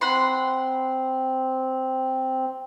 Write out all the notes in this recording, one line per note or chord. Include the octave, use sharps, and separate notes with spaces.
C4 F#5 B5 C6